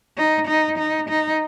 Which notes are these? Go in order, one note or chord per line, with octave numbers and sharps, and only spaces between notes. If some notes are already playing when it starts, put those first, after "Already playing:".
D#4
D#4
D#4
D#4